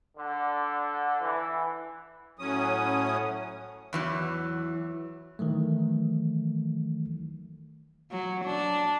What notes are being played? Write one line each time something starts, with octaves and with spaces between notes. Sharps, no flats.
D3
E3
A2 F#3 C#4 D#6
E2 E3 F#3
D#3 E3 F#3 A3
F#3
D4